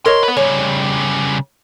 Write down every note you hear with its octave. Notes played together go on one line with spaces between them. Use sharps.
A#4 C#5 D#5 C6
B4 F#5
C#3 G3 C#5